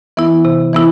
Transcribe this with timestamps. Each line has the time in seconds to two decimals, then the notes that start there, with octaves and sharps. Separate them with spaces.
0.17 E3 B3 E4
0.45 C3
0.73 E3 B3 E4